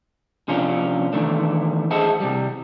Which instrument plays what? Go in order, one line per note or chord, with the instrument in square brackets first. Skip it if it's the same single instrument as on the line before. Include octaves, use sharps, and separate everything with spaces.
[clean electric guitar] C3 F3 C#4 D4 F4
D#3 E3 A3 D4
G#4 C5 D#5 E5 F#5 A5
C3 G3